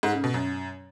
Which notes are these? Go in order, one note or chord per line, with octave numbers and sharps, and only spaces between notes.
G#2
C#3
B2
F#2